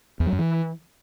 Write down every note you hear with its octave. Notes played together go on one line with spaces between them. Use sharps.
E2
F#3
F#2
E3